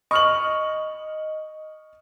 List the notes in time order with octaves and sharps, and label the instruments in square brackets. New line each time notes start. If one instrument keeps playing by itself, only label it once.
[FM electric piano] D#5 [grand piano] C#6 F6 F#7